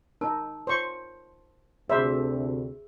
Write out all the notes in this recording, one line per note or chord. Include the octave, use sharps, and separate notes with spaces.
D#4 A#4 A5
C5 C#6
D2 C3 G#4 C5 E5 B5 E6